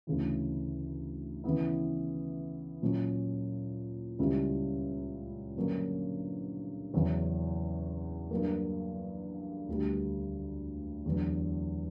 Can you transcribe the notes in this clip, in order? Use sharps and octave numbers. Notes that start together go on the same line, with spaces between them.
D2 C#3 E3
C#3 E3 B3 E4
A#2 F#3 C#4
C#2 C#3 G3 C#4 E4
G2 D3 F#3 A#3 C#4
E2 C#3 F#3 C#4 E4
G2 F#3 A#3
D2 D3 G3
E2 D3 F#3